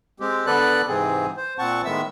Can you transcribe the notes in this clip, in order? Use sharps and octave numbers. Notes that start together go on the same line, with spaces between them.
G#3 C4 G4
D3 B3 A4 B4 D5 F#6
G#2 C3 E3 C4 G#4
C5
A#2 C4 F#5 A5 C#6
A2 D#3 G#3 B3 E5 E6